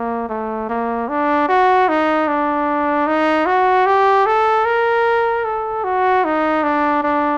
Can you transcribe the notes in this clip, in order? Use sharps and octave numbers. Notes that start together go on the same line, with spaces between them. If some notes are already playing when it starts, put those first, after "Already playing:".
Already playing: A#3
A3
A#3
D4
F#4
D#4
D4
D#4
F#4
G4
A4
A#4
A4
F#4
D#4
D4
D4